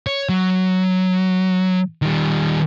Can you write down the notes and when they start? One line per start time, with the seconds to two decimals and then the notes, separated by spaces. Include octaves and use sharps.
0.07 C#5
0.29 F#3
2.02 D#3 G3